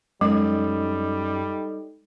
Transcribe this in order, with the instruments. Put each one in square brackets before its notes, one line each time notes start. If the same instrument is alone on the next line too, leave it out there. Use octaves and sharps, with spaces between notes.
[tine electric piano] F#2 [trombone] G3 [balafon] G#3 [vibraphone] D#4 A4 D#5